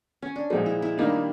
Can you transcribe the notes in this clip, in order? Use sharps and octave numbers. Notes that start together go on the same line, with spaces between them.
C#4
D4
A#2 F3 G#3 D#4
E4
E4
D#3 G3 A#3 D4 D#4
E4